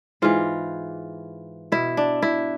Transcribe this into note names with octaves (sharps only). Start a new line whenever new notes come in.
G#2 E3 F4
B2 E4
D4
E4